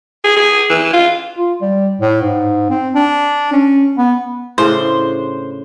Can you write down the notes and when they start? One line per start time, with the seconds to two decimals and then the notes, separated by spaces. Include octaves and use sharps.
0.24 G#4
0.36 G#4
0.70 E3
0.93 F4
1.37 F4
1.61 G3
2.01 A2
2.22 G#2
2.70 C4
2.95 D4
3.53 C#4
3.98 B3
4.58 A2 C#3 D4 C5